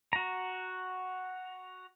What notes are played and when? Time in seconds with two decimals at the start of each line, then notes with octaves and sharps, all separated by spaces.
0.13 F#4 A#5